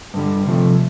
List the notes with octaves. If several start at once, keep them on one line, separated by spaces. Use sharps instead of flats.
G2 D3 G3
C3 F3 A3